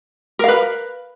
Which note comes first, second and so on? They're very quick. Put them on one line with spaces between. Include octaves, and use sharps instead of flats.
A#4 F5 B4